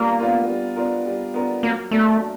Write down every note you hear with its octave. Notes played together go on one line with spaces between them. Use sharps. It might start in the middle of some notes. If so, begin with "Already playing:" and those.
Already playing: G3 A#3 B3 D4 F4 A#4
B3 D4 F4 A#4
G3
B3 D4 F4 A#4
G3
B3 D4 F4 A#4
F#3 A#3
A3 A#3 D4 F#4 A#4
F#3